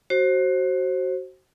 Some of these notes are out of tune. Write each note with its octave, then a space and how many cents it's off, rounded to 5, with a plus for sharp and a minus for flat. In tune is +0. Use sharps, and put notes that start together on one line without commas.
F#4 +20 C5 +20